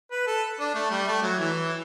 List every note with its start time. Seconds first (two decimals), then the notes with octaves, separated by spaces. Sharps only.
0.11 B4
0.27 A4
0.60 D4
0.75 A3
0.91 G3
1.08 A3
1.23 F#3
1.39 E3